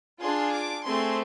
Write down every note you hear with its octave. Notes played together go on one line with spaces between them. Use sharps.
D4 F4 G#4 C6
D6
A3 C4 G#4 C6